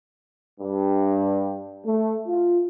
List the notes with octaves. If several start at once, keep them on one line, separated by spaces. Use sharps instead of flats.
G2
A3
F4